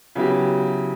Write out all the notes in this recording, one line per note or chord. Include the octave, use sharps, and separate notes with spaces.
C#3 F#3 B3 E4 G4